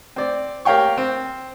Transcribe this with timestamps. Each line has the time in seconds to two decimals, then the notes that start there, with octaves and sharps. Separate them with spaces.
0.16 C4 D5
0.65 G4 A#4 C#5 F5 G5 C#6
0.98 C4